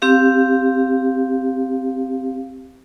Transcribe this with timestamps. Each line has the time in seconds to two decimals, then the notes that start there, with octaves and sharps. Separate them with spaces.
0.02 C4 G4 F5